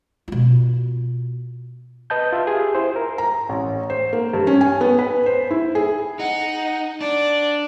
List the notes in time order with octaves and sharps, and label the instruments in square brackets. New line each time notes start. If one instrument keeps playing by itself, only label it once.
[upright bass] B2 F4
[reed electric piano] B4 D#5 A5 G6
F4 E5
F4 G4 G#4
E4 C5
A#4
[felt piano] A#5
A1
C5
A#3
G2
C#4
G#5
B3
B4
C5
E4
G#4
[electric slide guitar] D#4 [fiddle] F#5
[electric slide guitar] D4 [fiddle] D5